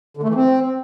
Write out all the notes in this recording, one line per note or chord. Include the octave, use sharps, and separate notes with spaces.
D3
A3
E3
C4